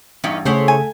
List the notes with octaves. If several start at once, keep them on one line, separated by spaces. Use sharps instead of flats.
E2 G2 C#4 D#4 B4
C#3 A3 E4 G#4 A4 C5 C#5 F#5
G#5